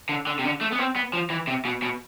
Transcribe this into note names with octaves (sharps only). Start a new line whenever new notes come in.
D3
D3
C3
D3
A3
B3
C4
B3
F3
E3
C3
B2
B2